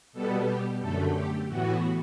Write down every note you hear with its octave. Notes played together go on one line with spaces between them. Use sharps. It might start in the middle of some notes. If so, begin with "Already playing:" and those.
B2 G3 B3 A4
G4
F#2 D3 A3 A4
G4
A2 E3 B3 F#4